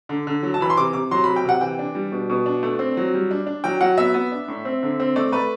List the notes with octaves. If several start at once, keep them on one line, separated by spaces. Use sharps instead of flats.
D3
D3
F#3
A5
E3 B5
C6
C3 D6
C3 D6
F#3 C6
C3 B5
G5
C3 F#5
E3 G5
D4
G3
B2
B2
D4
A3
C4
F#3
G3
D4
D4
F#3 G5
F#3 F#5
B3 E5
B3
D4
A2
C4
D3
C4
A3 D5
A3 B4